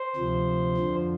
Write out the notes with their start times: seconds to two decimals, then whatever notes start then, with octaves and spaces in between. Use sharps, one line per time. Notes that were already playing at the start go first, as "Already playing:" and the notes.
Already playing: C5
0.16 D2 C3 F3
0.77 F2 D3 F3